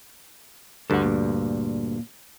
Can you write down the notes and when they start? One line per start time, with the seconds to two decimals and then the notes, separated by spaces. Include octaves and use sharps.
0.90 D2 G2 A4 F#5
1.02 A#2